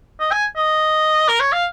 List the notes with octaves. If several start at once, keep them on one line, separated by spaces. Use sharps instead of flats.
D#5
G#5
D#5
A#4
C#5
F5